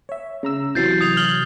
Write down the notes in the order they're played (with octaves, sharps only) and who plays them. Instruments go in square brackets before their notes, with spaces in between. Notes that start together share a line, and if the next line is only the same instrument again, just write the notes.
[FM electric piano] C#5 E5
C#3 A#5 E6
[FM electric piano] C3 E3 F#3 [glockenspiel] G6 A6 C7
[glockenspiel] D#6 G#6 F7
F6 F#7 G7